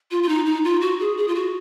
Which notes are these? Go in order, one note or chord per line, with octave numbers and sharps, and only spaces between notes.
F4
F4
D#4
D#4
F4
F#4
G#4
G#4
F4
F#4